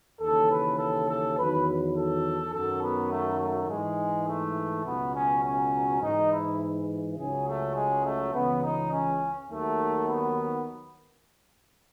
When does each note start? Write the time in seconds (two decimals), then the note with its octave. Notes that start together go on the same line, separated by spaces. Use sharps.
0.20 D#2 C#3 E3 A4
0.50 B4
0.78 A4
1.07 A4
1.37 E2 D#3 F#3 B4
1.94 A4
2.52 F#2 D#3 F#3 A4
2.82 B3
3.11 A3
3.40 A3
3.69 G#2 E3 G#3
4.27 A3
4.84 C#2 B2 F#3 B3
5.14 C#4
5.43 C#4
6.01 G#2 E3 D#4
6.30 E4
7.17 C#2 C#3 F#3 G#4
7.46 A3
7.75 G#3
8.04 A3
8.33 C#2 C#3 E3 B3
8.62 D#4
8.91 C#4
9.49 D#2 D#3 F#3 A3
10.07 B3